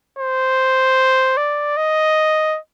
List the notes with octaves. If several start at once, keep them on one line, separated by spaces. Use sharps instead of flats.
C5
D5
D#5